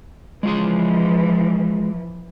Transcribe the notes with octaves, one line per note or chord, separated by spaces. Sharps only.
E3 F3 G#3 F4 G#4